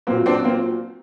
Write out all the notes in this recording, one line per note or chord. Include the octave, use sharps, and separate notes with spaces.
A#2 F#3 A#3 C4
C4 D4
A#3 C4